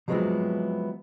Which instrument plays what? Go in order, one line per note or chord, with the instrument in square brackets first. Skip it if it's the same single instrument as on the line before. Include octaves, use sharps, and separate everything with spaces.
[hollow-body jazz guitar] F3 F#3 G#3 B3 C4 E4